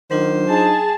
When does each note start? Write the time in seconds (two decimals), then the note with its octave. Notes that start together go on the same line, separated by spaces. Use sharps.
0.11 D#3 F#3 D4 F4 C5
0.49 D#4 G#4 A5